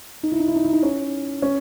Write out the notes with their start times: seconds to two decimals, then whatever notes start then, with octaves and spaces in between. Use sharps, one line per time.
0.23 D#4
0.32 E4
0.40 D#4
0.48 E4
0.56 D#4
0.65 E4
0.73 D#4
0.83 C#4
1.42 C#4